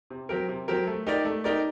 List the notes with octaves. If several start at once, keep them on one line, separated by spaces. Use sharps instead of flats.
C3
F#3 C4 G4 A#4
C3
F#3 C4 G4 A#4
A3
D#4 G4 A#4 D5
A3
D#4 G4 A#4 D5